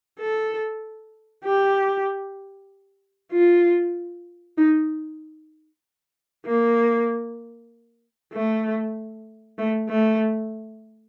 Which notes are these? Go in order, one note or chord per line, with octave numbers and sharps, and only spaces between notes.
A4
G4
F4
D#4
A#3
A3
A3
A3